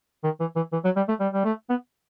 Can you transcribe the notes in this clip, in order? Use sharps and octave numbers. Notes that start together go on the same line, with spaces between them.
D#3
E3
E3
E3
F#3
G3
A3
G3
G3
A3
B3